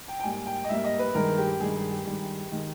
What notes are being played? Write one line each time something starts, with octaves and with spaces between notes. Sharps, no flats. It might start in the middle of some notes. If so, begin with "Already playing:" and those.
G5
G5
G#2 G3 A#3 G#5
G5
D#5
G#2 G3 A#3 E5
D#5
B4
G2 D#3 G#3 A#4
G4
G2 D#3 G#3 G#4
G#4
G4
G2 D#3 G#3
D#3 G#3